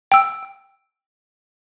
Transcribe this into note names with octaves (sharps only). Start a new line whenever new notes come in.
G5 E6